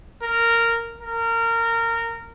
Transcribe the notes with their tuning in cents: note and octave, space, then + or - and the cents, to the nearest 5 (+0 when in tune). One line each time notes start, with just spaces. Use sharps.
A#4 -10
A#4 -20